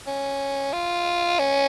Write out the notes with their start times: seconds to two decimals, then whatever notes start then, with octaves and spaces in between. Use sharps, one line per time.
0.07 C#4
0.73 F4
1.39 C#4